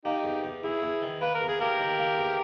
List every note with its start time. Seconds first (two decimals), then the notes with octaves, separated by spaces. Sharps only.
0.05 A#3 D#4 G4
0.24 E2
0.44 E2
0.63 E2 E4 G#4
0.82 E2
1.02 D#3
1.21 A#3 B4
1.34 A#4
1.41 E2
1.48 G#4
1.60 A#3 G4 A#4
1.79 D#3
1.98 A#3
2.18 E2